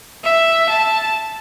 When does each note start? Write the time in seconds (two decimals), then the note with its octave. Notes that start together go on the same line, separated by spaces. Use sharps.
0.23 E5
0.69 A5